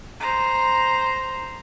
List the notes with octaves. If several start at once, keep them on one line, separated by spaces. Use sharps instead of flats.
C5 A#5